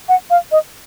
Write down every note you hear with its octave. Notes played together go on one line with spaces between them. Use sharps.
F#5
F5
D#5